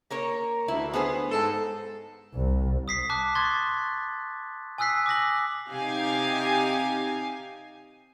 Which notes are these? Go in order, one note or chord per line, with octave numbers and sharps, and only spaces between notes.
A#3 A#4 C#5
D2 E4
B3 G#4 C5
G#2 A4
C2
D#6 B6 C7
A5 D6 F#6
C6 C#6 D#6 F#6 G#6 A6
G#5 D#6 E6 F#6 B6 C7
D6 D#6 A#6 F#7
C3 D#4 G4 F5 G#5 C7